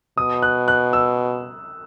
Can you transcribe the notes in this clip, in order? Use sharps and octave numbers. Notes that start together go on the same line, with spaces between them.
B2 D#6
F#6
F#6
E6